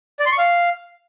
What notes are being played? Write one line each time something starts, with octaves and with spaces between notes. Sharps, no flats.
D5
C6
C#6
F5